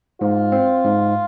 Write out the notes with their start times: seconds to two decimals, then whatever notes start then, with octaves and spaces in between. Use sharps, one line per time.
0.21 G#2 F4
0.52 C4
0.85 G#2